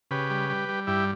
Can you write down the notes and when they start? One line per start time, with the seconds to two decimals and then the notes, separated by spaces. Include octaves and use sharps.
0.11 C#3 G4 B4
0.30 G3
0.49 G3
0.69 G3
0.87 G2 E4 G4